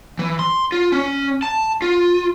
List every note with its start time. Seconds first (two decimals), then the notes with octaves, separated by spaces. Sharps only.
0.19 E3
0.39 C6
0.72 F4
0.92 C#4
1.43 A5
1.82 F4